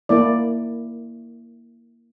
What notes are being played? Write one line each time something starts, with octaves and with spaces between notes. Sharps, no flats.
A#3 E4 D5